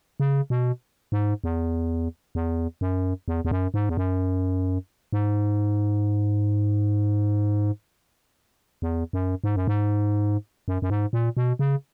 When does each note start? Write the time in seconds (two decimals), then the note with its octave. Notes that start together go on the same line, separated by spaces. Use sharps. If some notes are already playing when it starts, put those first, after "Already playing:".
0.20 C#3
0.50 B2
1.12 G#2
1.44 E2
2.35 E2
2.81 F#2
3.28 E2
3.45 E2
3.51 F#2
3.74 G#2
3.89 E2
3.97 F#2
5.13 G#2
8.82 E2
9.13 F#2
9.44 G#2
9.56 F#2
9.68 G#2
10.68 F#2
10.82 F#2
10.90 G#2
11.13 A#2
11.37 B2
11.59 C#3